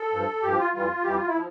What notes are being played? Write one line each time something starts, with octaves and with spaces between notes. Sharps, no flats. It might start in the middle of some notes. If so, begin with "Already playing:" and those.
Already playing: A4
G2 F3
G2 F3 G4
F4
F2 E3 G3 F4
F2 E3 G3 G4
F4
E4
F3